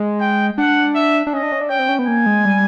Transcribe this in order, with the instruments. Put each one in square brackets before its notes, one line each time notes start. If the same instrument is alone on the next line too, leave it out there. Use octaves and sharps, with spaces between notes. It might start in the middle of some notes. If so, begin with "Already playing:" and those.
Already playing: [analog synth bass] G#3
[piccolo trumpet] G5
[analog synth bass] D4 [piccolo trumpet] F#5
[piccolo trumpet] E5
[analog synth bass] D4
[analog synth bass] C#4 [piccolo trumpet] D#5
[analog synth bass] D4
C#4
D4
[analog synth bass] C#4 [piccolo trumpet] G5
[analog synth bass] C4
C#4
B3
[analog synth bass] A#3 [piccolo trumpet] G#5
[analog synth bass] G#3
G3